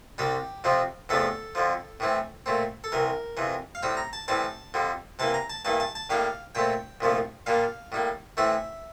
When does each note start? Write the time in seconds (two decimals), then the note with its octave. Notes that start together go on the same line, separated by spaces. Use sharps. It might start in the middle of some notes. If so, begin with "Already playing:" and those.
0.18 C2 C3 G3 G4
0.64 F2 C3 F3 C4
1.09 E2 C3 F3 A3 D4 A4
1.55 F2 D3 F3
2.00 A2 E3 A3 C4
2.46 A#2 A3 C4
2.84 A4
2.92 C2 C3 E3 A#4
3.37 F2 C3 E3
3.75 F5
3.83 A2 G3 C4 G5
3.97 A#5
4.13 A5
4.28 A2 E3 G3 C4 A5
4.74 F2 D3 G3
5.19 C3 E3 A#3 A5
5.34 A#5
5.50 A5
5.65 G2 E3 A#3 A5
5.80 A5
5.95 A5
6.10 A2 G3 A#3 D4 F5
6.55 A#2 A3 C4 G5
7.01 C2 A#2 F3 A3
7.46 A#2 G3 A#3 D4 F5
7.92 A2 G3 A#3
8.37 A2 E3 A3 C4 E5